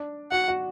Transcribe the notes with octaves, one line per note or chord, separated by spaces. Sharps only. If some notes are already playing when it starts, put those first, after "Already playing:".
Already playing: D4
F#4 F#5
F#4